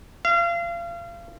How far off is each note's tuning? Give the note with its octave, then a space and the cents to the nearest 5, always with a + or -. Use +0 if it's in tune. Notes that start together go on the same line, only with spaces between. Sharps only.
F5 -30